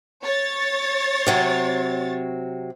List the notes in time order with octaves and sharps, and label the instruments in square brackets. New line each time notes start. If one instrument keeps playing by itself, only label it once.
[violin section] C#5 A6
[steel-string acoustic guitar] C3 F#3 C4